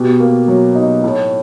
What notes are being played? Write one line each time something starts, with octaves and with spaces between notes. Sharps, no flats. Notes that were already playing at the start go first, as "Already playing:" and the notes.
Already playing: B2 G4
A#3
F#3
D#4
A2